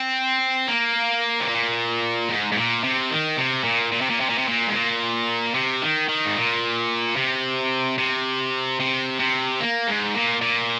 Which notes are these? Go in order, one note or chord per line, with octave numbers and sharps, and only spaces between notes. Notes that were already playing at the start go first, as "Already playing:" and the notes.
Already playing: C4
A#3
C3
A#2
G#2
G#2
A#2
C3
D#3
C3
A#2
A#2
C3
A#2
C3
A#2
C3
A#2
G#2
A#2
C3
D#3
D#3
G#2
A#2
C3
C3
C3
C3
A#3
G#2
A#2
A#2